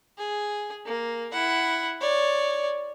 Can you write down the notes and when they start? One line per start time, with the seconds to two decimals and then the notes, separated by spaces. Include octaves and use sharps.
0.18 G#4
0.85 A#3
1.32 E4 F#5
2.01 C#5 D5